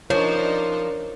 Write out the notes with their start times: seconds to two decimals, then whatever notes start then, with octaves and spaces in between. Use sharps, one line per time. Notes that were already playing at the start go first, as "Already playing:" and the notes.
0.10 F3 D4 D#4 A#4 C5 C#5